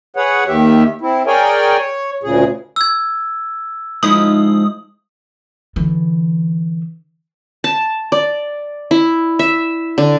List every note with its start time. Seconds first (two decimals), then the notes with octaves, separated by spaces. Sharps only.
0.16 G#4 B4 C#5 F#5
0.48 D#2 D#3 G4 E5
1.01 C4 E4
1.27 G#4 A#4 C#5 D5 G5 G#5
1.79 C#5
2.23 D2 A#2 C#3 G#4
2.76 E6 G#6
4.03 F3 G#3 D#4 E4 D#6 F#7
5.76 D3 E3
7.64 A5
8.12 D5
8.91 E4
9.39 E5
9.98 D3